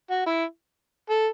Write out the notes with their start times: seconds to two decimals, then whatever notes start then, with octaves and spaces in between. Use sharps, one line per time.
0.10 F#4
0.26 E4
1.10 A4